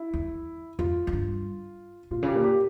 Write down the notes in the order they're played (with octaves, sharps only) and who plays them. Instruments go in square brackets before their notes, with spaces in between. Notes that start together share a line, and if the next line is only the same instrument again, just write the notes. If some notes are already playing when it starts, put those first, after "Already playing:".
Already playing: [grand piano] E4
[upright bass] E2
[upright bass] F2 [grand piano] F4
[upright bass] F2
G2
[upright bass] A#2 [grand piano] F4
[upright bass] C#3
[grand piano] G4
[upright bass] A#2
[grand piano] G4